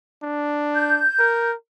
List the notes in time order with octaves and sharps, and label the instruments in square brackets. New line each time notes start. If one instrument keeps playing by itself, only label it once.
[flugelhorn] D4
[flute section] G6
[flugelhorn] A#4